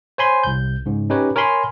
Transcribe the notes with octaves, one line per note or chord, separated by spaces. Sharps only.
C5 C#5 G#5 B5 C6
C2 G6
G#2 C#3
C#4 D#4 G4 B4 C#5
A#4 C#5 G#5 B5 C6